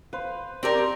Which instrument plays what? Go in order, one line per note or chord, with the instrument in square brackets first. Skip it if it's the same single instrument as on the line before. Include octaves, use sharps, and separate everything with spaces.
[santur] B4 C5 F5
[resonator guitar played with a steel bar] C4 G4 A#4 [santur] C5 D5